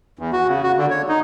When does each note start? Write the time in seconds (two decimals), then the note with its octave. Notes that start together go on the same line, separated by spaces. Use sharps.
0.19 E2
0.33 F#4
0.48 C#3
0.63 F#4
0.78 D3
0.90 C#5
1.09 D#4